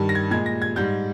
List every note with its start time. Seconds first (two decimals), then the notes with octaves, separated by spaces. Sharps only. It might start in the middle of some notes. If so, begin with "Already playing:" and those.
Already playing: G2 D#3 G3
0.09 A#6
0.15 G#6
0.31 A#2 G#3 G#6
0.46 A#6
0.62 G#6
0.76 G#2 G3 G6